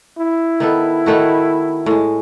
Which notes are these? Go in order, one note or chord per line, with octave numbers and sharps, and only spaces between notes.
E4
D#3 B3 A4
D#3 A3 F#4
A2 G#3